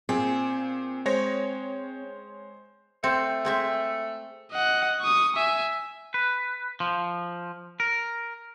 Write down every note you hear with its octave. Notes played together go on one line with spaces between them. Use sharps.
A#2 C4 G#4
G#3 C5 C#5 A#6
A3 C4
G#3 C4 E5
D#5 F#5
C#6 D#6
E5 G#5
B4
F3
A#4